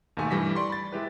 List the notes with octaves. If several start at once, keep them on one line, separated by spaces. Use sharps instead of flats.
D#2 G#2 B2 A3 G#5 C#6
G2 E3 G3 A#6 B6
D5 C6 C#6
B5 A6
G#3 E4 G4 B4